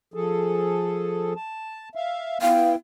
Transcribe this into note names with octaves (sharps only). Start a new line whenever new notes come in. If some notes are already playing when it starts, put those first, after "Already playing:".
F3 G#4 A4
A5
E5 F5
B3 E4 F5 G5